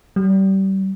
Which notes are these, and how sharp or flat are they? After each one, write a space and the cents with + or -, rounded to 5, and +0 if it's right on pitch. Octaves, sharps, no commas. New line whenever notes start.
G3 -30